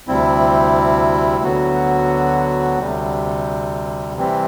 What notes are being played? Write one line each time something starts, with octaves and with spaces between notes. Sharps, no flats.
D2 C3 G3 C4 E4
D2 D3 F#3 B3 F#4
D2 C3 G3
C3 E3 G3 C4